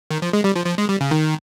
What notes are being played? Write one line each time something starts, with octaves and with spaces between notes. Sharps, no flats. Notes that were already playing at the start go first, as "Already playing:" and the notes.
D#3
F3
G#3
G3
F3
F3
G#3
G3
C#3
D#3